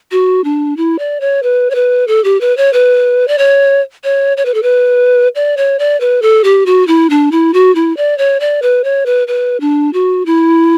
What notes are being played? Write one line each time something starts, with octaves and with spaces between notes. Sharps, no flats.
F#4
D4
E4
D5
C#5
B4
C#5
B4
A4
G4
B4
C#5
B4
D5
C#5
C#5
C#5
B4
A4
B4
D5
C#5
D5
B4
A4
G4
F#4
E4
D4
E4
F#4
E4
D5
C#5
D5
B4
C#5
B4
B4
D4
F#4
E4